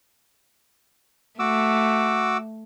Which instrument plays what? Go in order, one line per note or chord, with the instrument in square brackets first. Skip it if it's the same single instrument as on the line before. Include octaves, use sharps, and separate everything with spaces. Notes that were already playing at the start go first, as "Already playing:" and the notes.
[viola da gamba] A3 [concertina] F#4 D6 E6